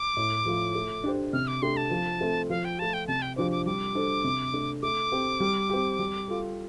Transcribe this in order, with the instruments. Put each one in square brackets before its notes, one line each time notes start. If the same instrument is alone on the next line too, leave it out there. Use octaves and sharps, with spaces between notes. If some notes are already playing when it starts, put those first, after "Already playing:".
Already playing: [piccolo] D6
[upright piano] A2
F3 A3 F4
A3
D4 G4 C5
[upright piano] C3 [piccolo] F6
[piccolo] D6
[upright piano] A3 D4 G4 [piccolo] C6
[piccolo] A5
[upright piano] F3
A3 C4 A4
[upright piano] F3 [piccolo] F5
[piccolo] G5
[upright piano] A3 F4 [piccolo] A5
[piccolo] G5
[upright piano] C3 [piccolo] A5
[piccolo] G5
[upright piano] F3 D4 G4 C5 [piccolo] D6
[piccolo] D6
[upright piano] G3 [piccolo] D6
[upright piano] D4 A4 C5
C3
A3 D4 A4
[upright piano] A3 [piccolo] D6
[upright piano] C4 G4
G3
C4 G4
G3
F4 A4